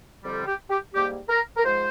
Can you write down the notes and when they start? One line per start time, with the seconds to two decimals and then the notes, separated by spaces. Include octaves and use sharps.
0.23 F2 D3 G3
0.46 G4
0.70 G4
0.94 G#2 G3 A#3 G4
1.29 A#4
1.57 A#4
1.64 G#2 F3 G#3 C5